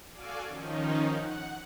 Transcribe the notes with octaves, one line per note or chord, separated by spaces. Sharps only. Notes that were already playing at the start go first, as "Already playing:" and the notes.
F#4 A4 D5 F5 G#5 D6
D#3 F3 C#4 D#4
F#5